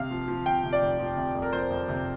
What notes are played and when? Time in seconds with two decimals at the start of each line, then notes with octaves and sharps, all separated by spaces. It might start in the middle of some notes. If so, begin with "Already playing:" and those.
Already playing: C3 F5
0.11 F3
0.28 F3
0.45 C3 G5
0.64 C3
0.73 D5
0.81 F1
0.99 F3
1.17 C3
1.35 F2
1.42 A#4
1.53 F3 C5
1.70 F2
1.88 C3